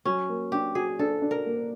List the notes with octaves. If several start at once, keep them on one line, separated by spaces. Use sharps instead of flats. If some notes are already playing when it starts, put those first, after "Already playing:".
F#3 C#4
A#3
D4 G4
F#4 G#4
D4 A4
D4
A#4
A#3